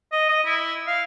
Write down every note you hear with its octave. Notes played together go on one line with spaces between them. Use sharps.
D#5
D#5
E4
F5